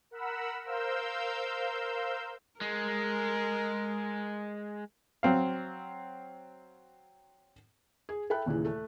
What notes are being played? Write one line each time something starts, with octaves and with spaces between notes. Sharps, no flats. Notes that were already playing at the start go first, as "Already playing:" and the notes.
A#4 F#5 B5 E6
A#4 C5 F5 E6 G6
G#3 A#4
F#3 C4 F5
G#4
A4 E5 G5 B5 F#6
D#2 A#2 C#3 E3
A3